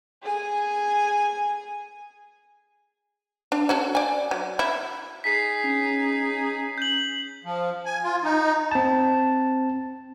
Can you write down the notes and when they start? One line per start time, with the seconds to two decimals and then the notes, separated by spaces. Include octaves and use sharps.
0.24 G#4 G#5
3.52 D4
3.69 C#4 F#4 A4
3.95 D5 G#5
4.31 F#3
4.59 E4
5.24 D#4 G#4 B6 C7
5.65 C#4
6.78 G6 F#7
7.44 F3
7.86 G#5
8.03 F4
8.24 D#4
8.71 C4 A5